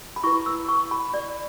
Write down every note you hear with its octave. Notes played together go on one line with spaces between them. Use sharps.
B5
E4 B4 C#6
E6
C#6
B5
D5